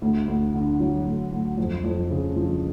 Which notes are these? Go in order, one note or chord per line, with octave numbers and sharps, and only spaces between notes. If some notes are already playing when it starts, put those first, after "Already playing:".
D2
D2
D3
F#3
D2
D2
F2
F2
C#3
F3